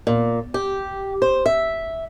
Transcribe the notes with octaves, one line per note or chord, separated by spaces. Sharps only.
A#2
G4
C5
E5